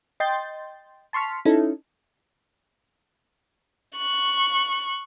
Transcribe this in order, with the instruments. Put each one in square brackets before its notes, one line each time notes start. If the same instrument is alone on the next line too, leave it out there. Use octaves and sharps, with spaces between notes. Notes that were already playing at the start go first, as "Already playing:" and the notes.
[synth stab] D#5 G5 C6 G6 A6
A5 C6 C#6 F6 B6
C#4 D#4 E4 A4
[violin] C#6 F#6